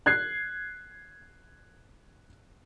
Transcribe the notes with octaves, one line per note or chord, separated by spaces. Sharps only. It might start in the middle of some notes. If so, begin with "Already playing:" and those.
F#6 G#6 C7